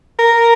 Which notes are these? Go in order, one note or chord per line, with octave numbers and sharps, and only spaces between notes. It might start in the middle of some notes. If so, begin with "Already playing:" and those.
A#4